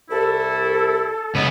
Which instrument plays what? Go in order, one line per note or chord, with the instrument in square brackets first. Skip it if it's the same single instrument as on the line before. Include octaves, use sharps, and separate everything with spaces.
[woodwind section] C2 E4 [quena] A4
[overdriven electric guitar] C#2 B3 [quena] D#5